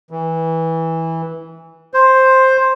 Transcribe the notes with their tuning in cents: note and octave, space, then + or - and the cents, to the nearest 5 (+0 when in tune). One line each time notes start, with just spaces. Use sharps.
E3 -15
C5 +5